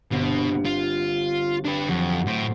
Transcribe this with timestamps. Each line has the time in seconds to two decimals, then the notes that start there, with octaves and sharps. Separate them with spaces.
0.11 G1 B2 C4
0.65 F4
1.65 D4 B4
1.89 F2 F#3
2.27 A2 C5